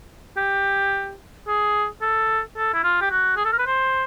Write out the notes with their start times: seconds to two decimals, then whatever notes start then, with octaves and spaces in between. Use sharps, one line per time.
0.37 G4
1.47 G#4
2.02 A4
2.57 A4
2.74 E4
2.84 F4
3.01 G4
3.11 F#4
3.37 G#4
3.45 A4
3.52 A#4
3.59 B4
3.67 C5